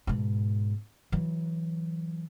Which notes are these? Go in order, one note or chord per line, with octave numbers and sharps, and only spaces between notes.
G#2 B2
E3 F#3